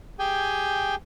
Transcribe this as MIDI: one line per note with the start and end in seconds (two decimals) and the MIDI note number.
0.19 0.95 67
0.19 0.95 68
0.19 0.95 79
0.19 0.95 80